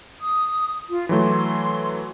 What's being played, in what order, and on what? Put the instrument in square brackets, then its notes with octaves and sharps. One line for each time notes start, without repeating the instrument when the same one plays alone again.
[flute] D#6
F4
[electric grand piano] E3 F#3 A3 [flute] C6